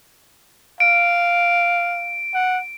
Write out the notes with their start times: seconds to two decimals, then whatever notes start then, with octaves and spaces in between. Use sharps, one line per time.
0.80 F5 D7
2.34 F#5